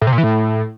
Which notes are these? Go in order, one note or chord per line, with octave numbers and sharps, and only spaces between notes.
A2
C3
A#2
E3
A2